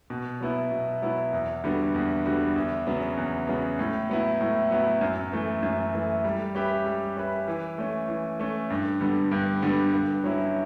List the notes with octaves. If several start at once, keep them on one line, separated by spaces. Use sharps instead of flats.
B2
F#3 B3 E4
B2
F#3 B3 E4
E2
D3 G3 B3 F#4
E2
D3 G3 B3 F#4
E2
C#3 F#3 B3
E2
C#3 F#3 B3
A2
F#3 B3 E4
A2
F#3 B3 E4
F#2
E3 A3
F#2
E3 A3
G3
C#4 G4 B4 E5
G3
C#4 G4 B4 E5
E3
A3 C#4
E3
A3 C#4
G2
D3 G3 B3
G2
D3 G3 B3
G2
F#3 C#4 E4